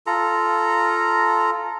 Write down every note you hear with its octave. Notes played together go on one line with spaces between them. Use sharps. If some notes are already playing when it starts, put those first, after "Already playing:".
F4 A4 A#5